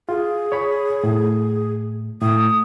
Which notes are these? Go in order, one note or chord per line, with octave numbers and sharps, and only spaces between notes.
F4 G#4
C#5 B5
A2
A2 D#6